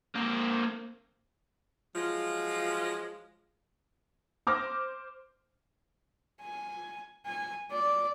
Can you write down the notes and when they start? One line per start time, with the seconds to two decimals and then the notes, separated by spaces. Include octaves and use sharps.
0.15 A#3 C4
1.95 F3 F#3 G#3 F4
4.47 C5 D6 F6 A#6
6.41 G#5
7.26 G#5
7.72 D5